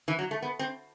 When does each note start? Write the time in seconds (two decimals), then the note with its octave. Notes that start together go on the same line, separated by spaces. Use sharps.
0.08 E3
0.19 F#3
0.31 A3
0.42 B3
0.59 C4